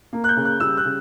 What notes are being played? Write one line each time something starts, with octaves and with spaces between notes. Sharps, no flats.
A#3
F#6
G6
C#3
F#6
G3 E6
F#6
C#3